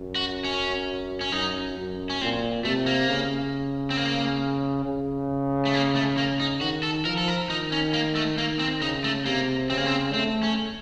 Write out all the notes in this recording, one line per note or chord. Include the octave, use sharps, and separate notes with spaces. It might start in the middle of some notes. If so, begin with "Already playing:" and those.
Already playing: F#2
F#4
C#4
C#4
F#2 D#4
F#2
C#4
A#2 C4
C3 A3
A#3
C#3
C4
A#3
C#3
A3
A#3
A3
A#3
D#4
D#3 F#4
A4
F3 A#4
A4
A#4
D#3 D#4
C#4
A#3
A3
D#3 A#3
C4
C#3 D#4
A3
C3 A#3
C#3 C4
A#3
C4
A3 C4
C#4